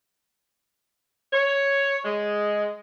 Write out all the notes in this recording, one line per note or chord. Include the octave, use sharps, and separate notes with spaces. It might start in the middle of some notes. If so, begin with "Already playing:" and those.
C#5
G#3